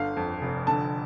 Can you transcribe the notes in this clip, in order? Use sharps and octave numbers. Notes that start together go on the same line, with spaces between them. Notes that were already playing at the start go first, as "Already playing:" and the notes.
Already playing: G1 D3 F5
F2
F1
D3 A5